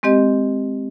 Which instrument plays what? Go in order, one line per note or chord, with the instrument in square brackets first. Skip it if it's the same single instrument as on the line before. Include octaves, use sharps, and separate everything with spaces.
[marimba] G#3 C4 G4 D#5